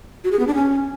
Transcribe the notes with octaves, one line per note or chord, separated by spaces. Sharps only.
F#4
G#4
B3
D4
C#4